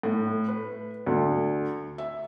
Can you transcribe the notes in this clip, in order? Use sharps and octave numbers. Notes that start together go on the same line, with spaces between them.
A2
B4
D2
E5